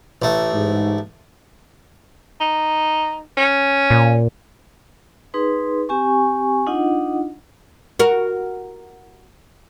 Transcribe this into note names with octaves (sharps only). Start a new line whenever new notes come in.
A1 A3
G#2
D#4
C#4
A#2
D#4 G#4 B4 C6
C4 G4 G#5 C#6
D4 D#4 F4 D#5 F#5
F#4 A#4